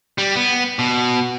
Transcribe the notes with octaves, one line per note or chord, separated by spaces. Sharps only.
G3
B3
B2